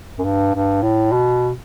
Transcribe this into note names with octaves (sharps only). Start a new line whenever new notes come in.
F#2
G2
G2
A2
B2